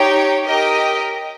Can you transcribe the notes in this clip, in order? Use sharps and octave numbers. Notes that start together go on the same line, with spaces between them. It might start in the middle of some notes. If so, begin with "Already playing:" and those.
Already playing: D#4 G4 C#5 G5
G4 A#4 D#5 G5